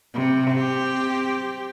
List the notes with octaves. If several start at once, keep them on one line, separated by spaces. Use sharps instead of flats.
C3
C4 G4